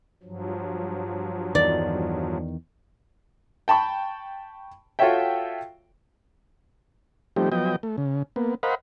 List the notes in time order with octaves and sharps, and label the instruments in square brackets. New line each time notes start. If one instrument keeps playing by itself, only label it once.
[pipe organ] G2 F3 F#3
[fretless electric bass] E2 D#3 [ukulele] D5
[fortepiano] G5 A5 B5 C#6
F4 F#4 A4 C#5 E5 G5
[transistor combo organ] F3 G3 A3 C4 D#4 G4
F3 F#3 B3 D#5 G5
A3
C#3
A#3 B3
A#4 C5 D#5 F5 F#5 B5